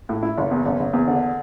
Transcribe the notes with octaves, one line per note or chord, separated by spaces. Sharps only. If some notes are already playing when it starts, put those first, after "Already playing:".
A2
E4
F#1
E2
F#1
F#1
E2
D3